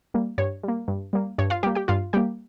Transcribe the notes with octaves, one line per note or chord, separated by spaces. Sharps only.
G3 A#3
G2 C#5
G3 A#3
G2
G3 A#3
G2 C#5
F4 F5
G3 A#3 G4 G5
G4 G5
G2 F4 F5
G3 A#3 G4 G5